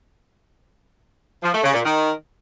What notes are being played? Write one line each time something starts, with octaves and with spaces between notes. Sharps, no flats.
F3
A3
C#3
A#2
D#3